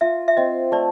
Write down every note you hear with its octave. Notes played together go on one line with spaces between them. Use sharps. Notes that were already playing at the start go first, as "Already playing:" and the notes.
F4 E5
E5
C4 D#5
A3 D5